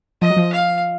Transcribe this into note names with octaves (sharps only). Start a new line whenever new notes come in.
F3 D#5
F#3
F3
F5